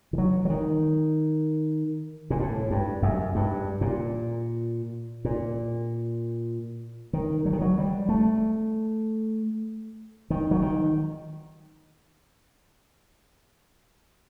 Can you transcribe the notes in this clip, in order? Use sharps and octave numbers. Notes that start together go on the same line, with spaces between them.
D#3
F#3
F#3
D#3
A#2
A2
G2
F#2
G2
A#2
A#2
D#3
F#3
D#3
F#3
G3
A3
D#3
F#3
D#3